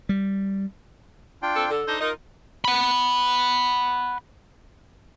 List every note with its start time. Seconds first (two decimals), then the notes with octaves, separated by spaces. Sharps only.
0.09 G3
1.42 D4 F4 G5
1.56 C4 A4
1.70 D3 A4
1.88 D4 D#4 C5
2.01 D#4 F4 A#4
2.65 F#5 B5